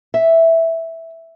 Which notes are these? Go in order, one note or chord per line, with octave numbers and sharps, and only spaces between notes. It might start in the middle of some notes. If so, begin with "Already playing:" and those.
E5